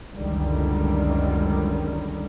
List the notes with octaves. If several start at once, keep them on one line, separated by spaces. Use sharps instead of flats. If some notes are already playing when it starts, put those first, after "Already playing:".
F#1 C#2 D3 D#3 G3